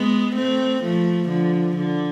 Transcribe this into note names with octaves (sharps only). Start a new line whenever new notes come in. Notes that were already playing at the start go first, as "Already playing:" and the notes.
Already playing: G#3 B3
A3 C4
F3 A3
D3 F3
D3